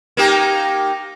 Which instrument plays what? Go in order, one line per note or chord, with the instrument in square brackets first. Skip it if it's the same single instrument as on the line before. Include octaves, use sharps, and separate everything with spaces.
[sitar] A#3 D#4 G4